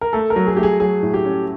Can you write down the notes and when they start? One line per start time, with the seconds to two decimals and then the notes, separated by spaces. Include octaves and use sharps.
0.01 A#4
0.13 A3 A4
0.30 A#4
0.36 F#3
0.47 G#4
0.57 A3 G4
0.63 G#4
0.80 F#3 G#4
1.03 A2
1.14 G4
1.25 C#4